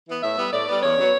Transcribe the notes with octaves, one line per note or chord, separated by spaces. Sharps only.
E3 B3
A2 E5
G3 B3
A2 D5
G3 B3
E2 C#5
C#3 F#3 B3